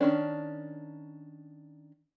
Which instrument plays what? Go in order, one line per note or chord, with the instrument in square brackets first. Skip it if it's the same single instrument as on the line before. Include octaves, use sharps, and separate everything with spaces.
[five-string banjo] D#3 F#3 C#4 D4